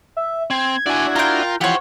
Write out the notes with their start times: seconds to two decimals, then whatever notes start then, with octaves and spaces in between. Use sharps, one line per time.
0.17 E5
0.50 C4 G#6
0.86 D4 E4 F#4 D5 G#5
1.16 F4 A#4 G5
1.61 E3 F3 G4 C5 C#5 F#5